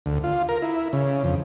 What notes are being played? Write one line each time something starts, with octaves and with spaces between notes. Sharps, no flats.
D2
F4
A#4
E4
C#3
F2